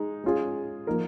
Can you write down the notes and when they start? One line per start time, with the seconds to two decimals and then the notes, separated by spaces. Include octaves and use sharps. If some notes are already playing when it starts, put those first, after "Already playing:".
Already playing: G#3 D#4
0.24 G#3 C#4 F4 G#4
0.87 F3 A#3 D#4 A#4